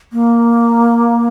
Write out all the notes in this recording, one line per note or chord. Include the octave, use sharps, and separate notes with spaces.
A#3